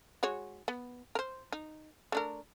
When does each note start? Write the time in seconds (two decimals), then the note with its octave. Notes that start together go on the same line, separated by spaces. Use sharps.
0.23 G#3 F#4 C#5
0.68 B3
1.15 A#4 C5
1.52 D#4
2.12 A3 D4 A#4